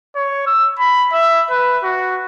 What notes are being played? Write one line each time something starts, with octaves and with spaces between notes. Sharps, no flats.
C#5
E6
B5
E5
B4
F#4